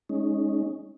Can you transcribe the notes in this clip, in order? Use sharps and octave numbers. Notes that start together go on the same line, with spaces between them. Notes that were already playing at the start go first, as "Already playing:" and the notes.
G#3 C#4 D#4